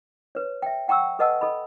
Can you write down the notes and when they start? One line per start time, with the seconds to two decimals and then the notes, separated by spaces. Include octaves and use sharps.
0.35 B4 C#5
0.62 E5 G5
0.88 F#5 G5 A#5 C#6 E6
1.19 A4 B4 D#5 F#5 A5 E6
1.41 A4 D#5 B5